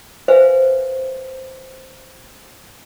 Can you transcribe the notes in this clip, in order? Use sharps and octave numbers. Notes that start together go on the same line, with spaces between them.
B4 C5 E5 F5 G#5